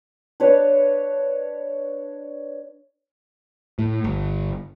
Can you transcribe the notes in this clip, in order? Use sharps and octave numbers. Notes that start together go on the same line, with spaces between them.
D4 B4 C#5
A2
G1